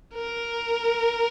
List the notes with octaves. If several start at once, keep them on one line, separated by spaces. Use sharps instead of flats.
A#4